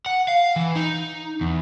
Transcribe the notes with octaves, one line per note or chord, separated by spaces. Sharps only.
F#5
F5
E3
D#4
E2